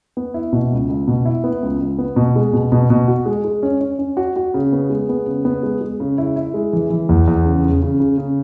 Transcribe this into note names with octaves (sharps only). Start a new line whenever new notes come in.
B3
E4
B2
C#2
C#2
B2
E4
B3
C#2
C#2
B3
B2
G#3
B2
B2
B2
F#4
G#3
G#3
C#4
C#4
C#4
F#4
F#4
C#3
B3
G#3
B3
C#3
B3
G#3
G#3
C#3
E4
E4
G#3
E3
E3
E2
E2
C#3
C#3
C#3
C#3
C#3